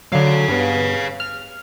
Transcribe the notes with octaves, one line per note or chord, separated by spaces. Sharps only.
D3 F#3 C#5 F5
G2 B3
F6